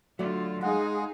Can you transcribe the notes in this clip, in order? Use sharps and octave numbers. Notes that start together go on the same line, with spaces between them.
D3 F#3 A3 F4 F#4 D5
G#3 D#4 G#4 F5 F#5